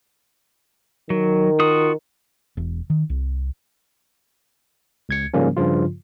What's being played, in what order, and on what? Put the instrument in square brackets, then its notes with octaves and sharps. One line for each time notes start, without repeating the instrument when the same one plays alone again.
[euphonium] D#3 [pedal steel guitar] F#3
[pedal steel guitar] F4 F#4 D#6
[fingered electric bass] E1
D#3
C2
[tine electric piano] C#2 G#6 C#7
G#2 C#3 F3 G3 A#3 C#4
G2 C#3 F3 F4